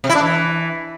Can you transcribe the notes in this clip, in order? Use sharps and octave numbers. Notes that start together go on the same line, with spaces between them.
C3
E4
D4
E3